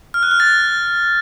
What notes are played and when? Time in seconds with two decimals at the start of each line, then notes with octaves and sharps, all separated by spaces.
0.14 F6
0.23 F#6
0.31 F6
0.40 A6